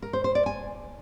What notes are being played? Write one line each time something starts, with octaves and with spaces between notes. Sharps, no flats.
A#4
C5
C5
D5
G#5